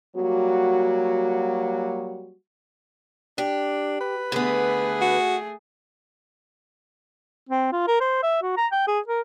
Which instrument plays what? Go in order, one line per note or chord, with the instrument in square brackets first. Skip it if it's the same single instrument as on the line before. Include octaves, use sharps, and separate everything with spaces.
[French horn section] F#3 G3 A#3 F#4
[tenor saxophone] D4 [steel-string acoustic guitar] G4
[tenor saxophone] B4
[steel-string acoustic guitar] D3 B3 [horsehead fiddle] A3 G#4
[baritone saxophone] F#4
[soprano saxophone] C4
F4
A#4
C5
E5
F#4
A#5
G5
G#4
A#4